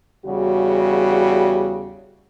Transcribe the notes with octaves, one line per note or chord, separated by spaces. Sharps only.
E2 C#3 G3 F#4